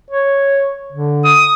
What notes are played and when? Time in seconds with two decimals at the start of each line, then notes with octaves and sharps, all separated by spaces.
0.10 C#5
0.92 D3
1.24 D#6